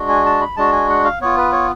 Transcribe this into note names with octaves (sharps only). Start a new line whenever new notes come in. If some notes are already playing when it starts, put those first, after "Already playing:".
Already playing: G#3 D4 F#4
G#5
A5
B5
G#3 D4 F#4 A5
G#5
F#5
F5
B3 F4 C#5
B4
C#5